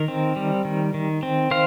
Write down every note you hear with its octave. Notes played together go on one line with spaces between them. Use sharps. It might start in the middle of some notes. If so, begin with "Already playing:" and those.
Already playing: D#3 A#4
C4
G3
D#3
D#3
C4
D#3 C5 F5